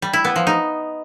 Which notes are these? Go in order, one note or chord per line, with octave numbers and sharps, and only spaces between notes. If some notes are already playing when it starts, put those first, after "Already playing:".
G3
E4
B3
F3
D#4